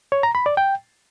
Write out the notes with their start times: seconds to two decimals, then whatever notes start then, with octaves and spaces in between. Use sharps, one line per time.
0.12 C#5
0.23 A#5
0.35 B5
0.46 D5
0.57 G5